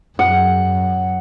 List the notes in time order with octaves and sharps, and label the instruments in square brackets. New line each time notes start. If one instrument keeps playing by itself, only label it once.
[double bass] F#2 [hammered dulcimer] F#5